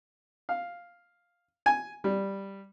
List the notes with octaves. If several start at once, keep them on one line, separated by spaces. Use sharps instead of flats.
F5
G#5
G3